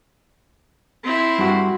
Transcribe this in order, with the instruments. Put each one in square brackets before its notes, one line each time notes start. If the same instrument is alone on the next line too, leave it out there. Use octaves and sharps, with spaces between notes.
[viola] C4 E4
[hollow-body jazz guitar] G2 F#4